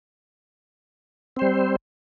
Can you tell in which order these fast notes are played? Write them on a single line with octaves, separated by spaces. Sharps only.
C4 C5 G3